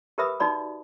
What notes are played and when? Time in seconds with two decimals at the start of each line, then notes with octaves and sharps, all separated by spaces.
0.18 G4 A#4 B4 E5 B5 D#6
0.40 D#4 F#4 D5 B5